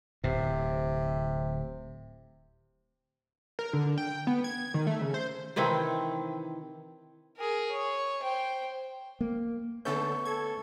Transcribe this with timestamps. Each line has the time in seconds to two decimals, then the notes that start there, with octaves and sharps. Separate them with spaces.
0.24 D1 A2 C3
3.59 A#4
3.73 D3
3.98 G5
4.27 B3
4.44 G#6
4.74 D#3
4.87 A3
5.02 C#3
5.14 C5
5.56 C3 D#3 E3 C4
7.37 G#4 A#4
7.71 C#5
8.22 C5 G5
9.21 A#3
9.85 D3 A3 B3 C#4 A4 C#6 G6
10.25 A4 G#6